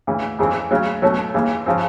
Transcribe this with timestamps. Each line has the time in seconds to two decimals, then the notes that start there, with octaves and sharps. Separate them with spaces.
0.07 D2 C#3 E3
0.39 F2 C#3 E3 G#3 C4
0.71 D2 C#3 F#3
1.02 B2 F#3 A3 C#4
1.34 D#2 C#3 E3 G#3
1.66 C#3 F3 G#3 C4